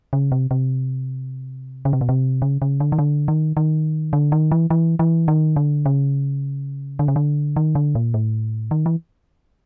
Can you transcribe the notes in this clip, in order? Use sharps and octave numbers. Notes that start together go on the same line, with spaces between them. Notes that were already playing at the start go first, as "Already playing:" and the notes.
C#3
C3
C3
C#3
C3
B2
C3
C#3
C#3
D3
D#3
D3
D#3
D#3
D3
D#3
E3
E3
E3
D#3
D3
C#3
D3
C#3
D3
D#3
D3
A#2
A2
D#3
E3